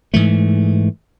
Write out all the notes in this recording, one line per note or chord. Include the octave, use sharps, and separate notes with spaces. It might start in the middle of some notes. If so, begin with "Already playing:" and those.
G#2 E3 A3